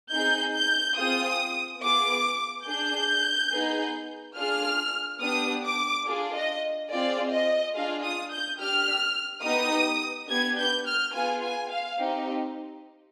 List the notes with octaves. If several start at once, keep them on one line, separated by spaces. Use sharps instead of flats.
C4 D#4 G#4 G6
G6
C4 F4 G#4 D#6
B3 F4 G#4 D6
D4 G#4 G6
B3 D#4 G#4
D4 F4 G#4 F6
B3 D4 G4 D#6
D6
D4 F4 G#4
D#5
C4 F4 G#4 D5
D#5
D4 F4 G#4 F5
D#6
G6
D4 G4 F6
B3 D#4 G4 D#6
B3 D4 G4 G#6
G6
F6
B3 F4 G#4 G#5
G#5
F5
C4 D#4 G4